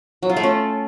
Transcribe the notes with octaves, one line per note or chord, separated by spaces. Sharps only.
F#3
F4
A3
C#4